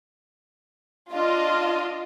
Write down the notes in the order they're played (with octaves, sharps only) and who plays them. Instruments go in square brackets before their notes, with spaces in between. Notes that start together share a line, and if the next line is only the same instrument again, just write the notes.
[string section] D4 F4 D#5